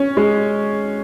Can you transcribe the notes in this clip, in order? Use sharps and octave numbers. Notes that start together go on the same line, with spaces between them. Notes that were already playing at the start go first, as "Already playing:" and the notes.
Already playing: C#4
G#3